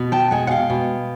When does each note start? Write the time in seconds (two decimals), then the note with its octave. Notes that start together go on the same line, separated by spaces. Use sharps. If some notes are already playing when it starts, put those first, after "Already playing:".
Already playing: B2
0.12 G5 A5
0.31 G#3 F#5 G#5
0.47 F#5
0.51 F5 G5
0.70 B2